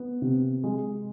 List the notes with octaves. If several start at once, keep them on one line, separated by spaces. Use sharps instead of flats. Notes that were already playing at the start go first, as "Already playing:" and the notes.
Already playing: B3
C3
G#3